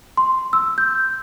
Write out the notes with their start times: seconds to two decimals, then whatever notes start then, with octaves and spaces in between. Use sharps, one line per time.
0.17 C6
0.53 E6
0.78 G6